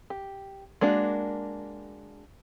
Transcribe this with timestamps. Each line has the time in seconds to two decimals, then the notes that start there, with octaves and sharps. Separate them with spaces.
0.10 G4
0.81 G#3 A#3 D4 F#4